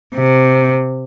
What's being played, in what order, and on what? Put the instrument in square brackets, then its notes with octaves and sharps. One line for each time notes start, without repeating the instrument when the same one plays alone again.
[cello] C3